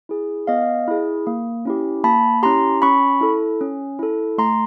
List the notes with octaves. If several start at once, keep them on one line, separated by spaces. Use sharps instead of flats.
E4 G#4
B3 D#5 F5
E4 G#4
A#3
C#4 E4 G4
A#3 A5 B5
C#4 E4 G4 A#5 C6
C#4 B5 C#6
E4 A4
C#4
E4 A4
A3 A#5 C6